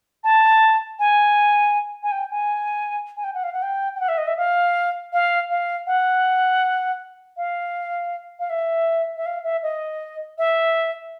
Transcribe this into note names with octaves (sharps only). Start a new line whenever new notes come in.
A5
G#5
G#5
G5
G#5
G#5
G5
F#5
F5
F#5
G5
G5
F#5
E5
D#5
E5
F5
F5
F5
F#5
F5
F5
E5
E5
F5
E5
D#5
E5